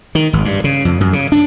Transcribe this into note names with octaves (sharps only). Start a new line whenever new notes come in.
D#3
G#1
G2
C#3
F2
F#2
C#3
D4